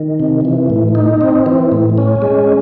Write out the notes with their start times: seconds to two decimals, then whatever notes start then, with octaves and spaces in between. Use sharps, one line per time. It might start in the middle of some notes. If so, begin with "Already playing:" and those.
Already playing: D#3
0.20 C3
0.45 E3
0.70 A2
0.95 D#4
1.21 C4
1.46 E3
1.72 A2
1.98 C#4
2.22 G#3